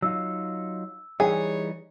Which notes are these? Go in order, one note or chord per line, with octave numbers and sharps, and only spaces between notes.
F#3 D#4 F4 E6
E3 G3 D#4 G#4 C#5